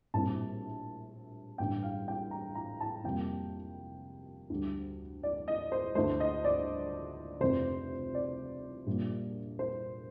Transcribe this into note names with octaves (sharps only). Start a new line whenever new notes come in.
A#1 A2 G3 C4 A5
A1 G2 D3 G3 G5
F5
G5
A#5
A#5
A5
F2 C3 G3 A#3 G5
D2 D3 G3
D5
D#5
C5
D2 D3 A3 C5
D#5
D5
F1 F2 C3 C5
D5
A#1 A#2 G3 A#3
C5